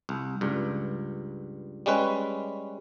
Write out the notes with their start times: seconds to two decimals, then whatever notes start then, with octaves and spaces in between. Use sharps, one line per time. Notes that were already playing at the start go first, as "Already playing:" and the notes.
0.09 C2
0.41 C#2 G2
1.86 G3 G#3 C#4 B4